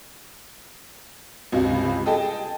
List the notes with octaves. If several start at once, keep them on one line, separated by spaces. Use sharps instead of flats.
C#2 G2 C3
G#4 A4 D#5 G5 A5